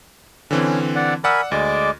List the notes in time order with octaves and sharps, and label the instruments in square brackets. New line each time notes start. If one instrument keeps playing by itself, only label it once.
[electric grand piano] D3 E3 C4 [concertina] C#4
[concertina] D5 F#5
[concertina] A#4 G#5 B5 [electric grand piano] D5 F#5 E6
[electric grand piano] D2 [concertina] G#3 D5 D6